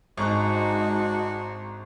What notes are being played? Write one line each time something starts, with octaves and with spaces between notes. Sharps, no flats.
G#1 G#3 D4 D#4 F#4 C#6 F#6